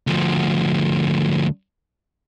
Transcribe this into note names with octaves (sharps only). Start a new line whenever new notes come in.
D2 F3